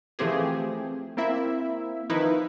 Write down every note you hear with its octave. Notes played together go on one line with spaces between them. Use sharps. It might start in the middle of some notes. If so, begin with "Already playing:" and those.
E3 F3 A3 C4 G4 G#4
A#3 C4 E4 E5
D#3 F3 D#4 E4 B4